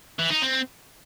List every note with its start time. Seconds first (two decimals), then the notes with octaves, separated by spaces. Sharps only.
0.19 E3
0.30 D#4
0.42 C4